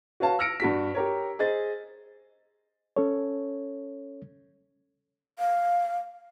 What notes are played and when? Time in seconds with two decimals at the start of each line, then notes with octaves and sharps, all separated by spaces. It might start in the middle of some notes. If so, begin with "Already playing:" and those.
0.20 F#4 B4 C#5 F5 A5
0.39 E6 F6 A#6 C#7 D7
0.60 G2 F#4 B6
0.95 G4 A#4 C#5
1.39 G#4 C5 D#5 A6
2.97 C#4 A4 C#5
5.39 F5